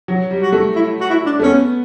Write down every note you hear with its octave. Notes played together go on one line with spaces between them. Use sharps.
F#3
G3
F#4
A3
E4
F#4
E4
D4
A3
B3 C#4